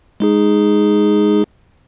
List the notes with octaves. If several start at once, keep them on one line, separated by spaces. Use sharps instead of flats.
G#3 D#4 G#4